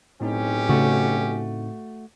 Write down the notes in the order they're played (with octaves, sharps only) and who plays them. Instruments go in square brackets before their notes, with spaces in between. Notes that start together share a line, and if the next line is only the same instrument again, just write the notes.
[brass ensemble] B1 C#4 G4 [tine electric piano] A2 C4 D#4
[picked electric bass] C#3 [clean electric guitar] A3 F#4